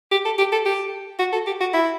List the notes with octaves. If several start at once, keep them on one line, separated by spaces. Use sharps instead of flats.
G4
A4
G4
A4
G4
F#4
A4
G4
F#4
E4